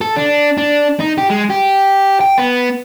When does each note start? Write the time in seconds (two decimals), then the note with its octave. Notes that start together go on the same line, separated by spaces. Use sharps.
0.01 A4
0.16 D4
0.58 D4
1.00 D#4
1.18 G4
1.30 G#3
1.50 G4
2.21 G5
2.38 B3